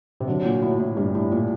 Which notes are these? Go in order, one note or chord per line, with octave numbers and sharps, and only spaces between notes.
C3
D3 F#3
A#2
A2
A2
G2 G3
A2
A#2